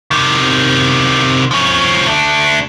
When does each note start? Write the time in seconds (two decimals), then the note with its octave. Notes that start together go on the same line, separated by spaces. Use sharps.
0.11 C3 D#3
1.51 F3 C#4
2.06 A3 D4